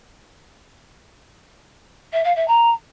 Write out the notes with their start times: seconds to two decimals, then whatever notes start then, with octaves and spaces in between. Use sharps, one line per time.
2.13 E5
2.24 F5
2.36 E5
2.48 A#5